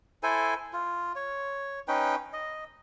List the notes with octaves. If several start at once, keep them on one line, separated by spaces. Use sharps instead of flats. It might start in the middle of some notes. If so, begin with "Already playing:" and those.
E4 A4 C5 G#5
F4
C#5
C#4 D#4 B4 G5
D#5